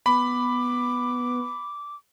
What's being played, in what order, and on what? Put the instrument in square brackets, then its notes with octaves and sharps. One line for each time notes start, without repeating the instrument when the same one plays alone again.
[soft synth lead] B3 [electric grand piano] B5 [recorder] D6